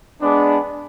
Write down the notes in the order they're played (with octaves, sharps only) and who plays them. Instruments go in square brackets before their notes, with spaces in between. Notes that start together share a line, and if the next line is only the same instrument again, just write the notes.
[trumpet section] G#3 B3 D4